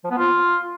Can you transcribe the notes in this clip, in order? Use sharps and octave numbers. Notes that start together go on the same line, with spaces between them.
F3
B3
F4